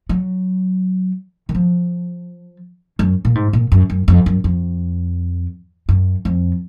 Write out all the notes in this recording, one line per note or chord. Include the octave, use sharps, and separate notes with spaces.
F#3
D#3
F3
F#2
A#2
G#2
A#2
F#2
F#2
F2
F#2
F2
F#2
F2